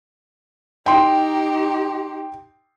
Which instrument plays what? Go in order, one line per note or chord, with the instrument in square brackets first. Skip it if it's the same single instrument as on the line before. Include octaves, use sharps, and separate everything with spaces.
[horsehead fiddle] D#4 G4 [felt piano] G5 C6